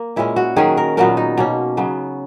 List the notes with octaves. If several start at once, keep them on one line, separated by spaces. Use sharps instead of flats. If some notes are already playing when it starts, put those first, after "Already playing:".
Already playing: A#3
A#2 G#3 C#4 E4
F#4
D#3 F#3 C#4 G#4
A#4
A#2 F#3 B3 A#4
D#4
B2 A#3 C#4
C#3 F#3 B3